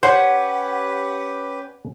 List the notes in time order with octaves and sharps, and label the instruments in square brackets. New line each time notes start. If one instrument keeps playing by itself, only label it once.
[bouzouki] C#4 [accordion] G4 B4 [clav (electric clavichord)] C5 [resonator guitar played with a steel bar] F#5